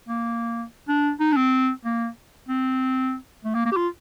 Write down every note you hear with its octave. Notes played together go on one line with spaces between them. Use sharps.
A#3
D4
D#4
D4
C4
A#3
C4
A3
A#3
A#3
G4
F4